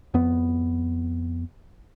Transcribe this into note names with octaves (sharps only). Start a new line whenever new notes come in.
F2 B3